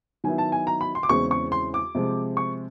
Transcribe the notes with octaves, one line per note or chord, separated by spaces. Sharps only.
D#3 F#3 B3 E4 G#5
A5
G#5
A#5
B5
C6
D6
E2 C#3 E3 G#3 C4 C#6
C#6
C6
D6
C3 F3 G#3
C#6